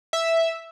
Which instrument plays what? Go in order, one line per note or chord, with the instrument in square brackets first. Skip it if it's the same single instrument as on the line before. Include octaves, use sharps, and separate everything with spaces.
[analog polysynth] E5